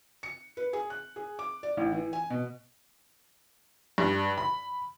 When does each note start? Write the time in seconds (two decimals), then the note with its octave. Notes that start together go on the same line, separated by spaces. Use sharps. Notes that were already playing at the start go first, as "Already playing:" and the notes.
0.23 C#7
0.57 B4
0.73 G#4
0.90 F#6
1.16 G#4
1.39 D6
1.63 D5
1.77 A1
1.92 E3
2.13 G#5
2.30 B2
3.98 G2
4.38 B5